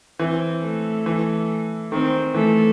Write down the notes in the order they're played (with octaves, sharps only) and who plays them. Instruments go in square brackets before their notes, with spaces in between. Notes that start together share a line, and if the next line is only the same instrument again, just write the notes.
[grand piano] E3 [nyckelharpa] C4
[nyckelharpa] A3
[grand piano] E3
[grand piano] D#3 [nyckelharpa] C4
[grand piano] E3 [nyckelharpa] A3